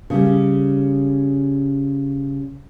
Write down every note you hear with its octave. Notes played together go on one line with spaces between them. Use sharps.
C#3 G3